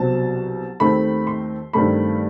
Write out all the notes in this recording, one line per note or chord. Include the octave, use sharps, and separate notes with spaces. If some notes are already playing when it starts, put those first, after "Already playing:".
Already playing: C2 B2 F#3 C4 A5
D#2 D#3 A3 C4 B5
C6
G2 D#3 A3 C4 B5